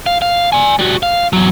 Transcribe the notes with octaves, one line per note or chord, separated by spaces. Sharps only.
F5
F5
D5 G#5
G3 F#4
F5
E2 F#3